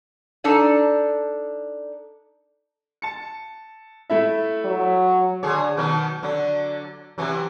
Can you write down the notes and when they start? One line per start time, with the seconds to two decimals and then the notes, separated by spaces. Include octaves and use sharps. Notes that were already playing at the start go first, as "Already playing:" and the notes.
0.44 D4 D#4 A4 D5
3.02 A5 C#7
4.10 A3 E4 E5
4.65 F#3
5.43 D3 G#4 C#5
5.77 B2 D#3 F#3
6.23 D3 F#3
7.18 C3 E3 F#3